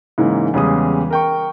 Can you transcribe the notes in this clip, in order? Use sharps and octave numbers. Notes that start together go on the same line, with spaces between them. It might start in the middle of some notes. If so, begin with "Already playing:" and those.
G#2 C#3 E3 A#3
E2 C#3 G3 G#3 D#6
A#4 G5 C#6